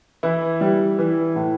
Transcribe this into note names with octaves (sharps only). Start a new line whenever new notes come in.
E3 E4
G3
E3
A2